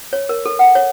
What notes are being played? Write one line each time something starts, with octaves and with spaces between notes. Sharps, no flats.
C#5
A#4
A4
F#5
C#5